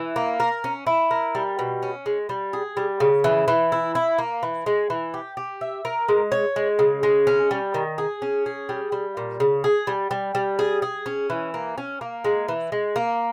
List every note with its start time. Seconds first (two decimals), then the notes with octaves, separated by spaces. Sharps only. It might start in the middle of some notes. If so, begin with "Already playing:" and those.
Already playing: E3
0.16 A#3
0.40 A#4
0.64 C#4
0.87 E4
1.11 A#4
1.35 G3
1.59 B2
1.83 C#4
2.06 G#3
2.29 G3
2.53 G#4
2.77 G3
3.00 C#3
3.24 E3
3.48 E3
3.72 E4
3.95 E4
4.18 A#3
4.43 E3
4.66 G#3
4.90 E3
5.14 G4
5.37 G4
5.61 E5
5.85 A#4
6.09 G#3
6.32 C#5
6.56 G#3
6.79 C#3
7.03 G#3
7.27 C#4
7.51 G3
7.74 D#3
7.98 G#4
8.22 C#4
8.46 G#4
8.69 G3
8.92 G3
9.17 A#2
9.40 C#3
9.64 G#4
9.87 G3
10.11 G3
10.35 G3
10.59 G#4
10.82 G#4
11.06 C#4
11.30 E3
11.54 A#3
11.78 C#4
12.01 A#3
12.24 G#3
12.48 E3
12.72 G#3
12.96 A#3